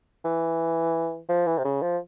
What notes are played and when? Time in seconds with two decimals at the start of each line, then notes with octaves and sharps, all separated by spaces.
0.25 E3
1.29 F3
1.47 E3
1.58 C3
1.65 C#3
1.82 F3